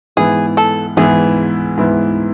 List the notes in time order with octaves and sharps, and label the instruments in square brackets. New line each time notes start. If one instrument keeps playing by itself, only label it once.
[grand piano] G#2 E3 B3 E4 [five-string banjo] G#4
[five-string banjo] A4
[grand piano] G#2 E3 B3 E4 [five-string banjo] G#4
[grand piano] G#2 E3 B3 E4